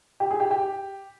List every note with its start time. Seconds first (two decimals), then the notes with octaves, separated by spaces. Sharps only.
0.20 G4
0.31 G#4
0.40 G4
0.51 G4